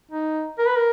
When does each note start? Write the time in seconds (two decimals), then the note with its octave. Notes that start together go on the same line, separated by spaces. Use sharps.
0.11 D#4
0.58 A#4
0.67 B4
0.76 A#4